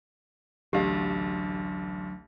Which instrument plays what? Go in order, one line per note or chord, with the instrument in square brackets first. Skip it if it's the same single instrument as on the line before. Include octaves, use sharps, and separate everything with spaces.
[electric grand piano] A1 D2 [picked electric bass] F#3 D4 [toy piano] G4 F5